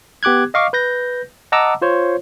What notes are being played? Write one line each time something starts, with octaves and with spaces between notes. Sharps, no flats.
B3 G4 D6 F#6 G#6
D#5 F5 C#6 D6
B4 G6 A#6
D#5 F#5 A5 A#5 D6 E6
F4 C5 C#5